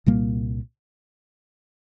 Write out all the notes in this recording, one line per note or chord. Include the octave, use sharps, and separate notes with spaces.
C2 A#2 G3 A#3